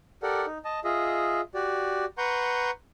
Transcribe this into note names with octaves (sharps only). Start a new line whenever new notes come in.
G4 A4 A#4 D5 F#5
D#4
D#5 A5
F4 G#4 D#5 E5
F#4 G4 D5
B4 F#5 A#5 C6 C#6 G6